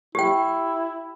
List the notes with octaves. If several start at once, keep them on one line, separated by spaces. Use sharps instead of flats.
E4 G4 G5